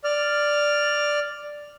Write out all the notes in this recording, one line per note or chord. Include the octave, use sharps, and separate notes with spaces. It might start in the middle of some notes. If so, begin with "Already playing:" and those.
D5 F6